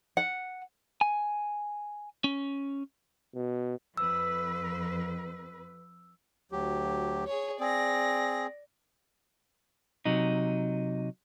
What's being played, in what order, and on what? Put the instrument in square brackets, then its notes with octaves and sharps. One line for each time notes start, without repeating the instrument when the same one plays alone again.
[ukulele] F#5
[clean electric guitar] G#5
C#4
[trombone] B2
[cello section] F2 B4 [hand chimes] E6
[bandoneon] D2 F#3 G4
[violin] G#4 C#5
[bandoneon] C4 G#4 [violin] D5 A#6
[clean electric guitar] C3 F#3 D#4